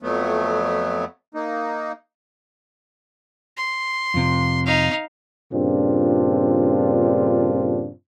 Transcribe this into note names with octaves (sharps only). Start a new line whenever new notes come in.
F2 F#3 A3 B3
A#3 D#4
C6
F2 C3
D#4 F5
G2 A#2 C#3 C4 D4 F4